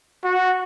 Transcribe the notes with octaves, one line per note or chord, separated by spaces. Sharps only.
F#4